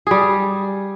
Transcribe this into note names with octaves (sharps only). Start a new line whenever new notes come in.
G3 G#4